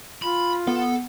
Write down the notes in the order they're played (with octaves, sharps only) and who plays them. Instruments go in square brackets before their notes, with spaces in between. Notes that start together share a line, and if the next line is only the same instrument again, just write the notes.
[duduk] F4 [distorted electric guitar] B5
[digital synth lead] B3 [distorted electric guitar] A4